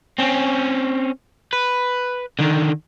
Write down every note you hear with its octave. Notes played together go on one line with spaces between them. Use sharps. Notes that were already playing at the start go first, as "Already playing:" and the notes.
C4 C#4
B4
D3 D#3